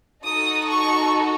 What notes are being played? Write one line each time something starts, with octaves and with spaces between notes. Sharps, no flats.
D#4 F#4 A4 D#6
C#6